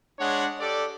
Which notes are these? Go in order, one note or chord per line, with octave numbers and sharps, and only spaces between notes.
G#3 D4 C#5 F#5
G4 A4 D5